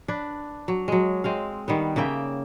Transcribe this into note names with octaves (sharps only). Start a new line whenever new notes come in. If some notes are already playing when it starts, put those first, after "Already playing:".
D4 B4
F#3
F#3 G#3
G#3 C4 F5
D#3 G3 B3
C#3 A#3 E5 G5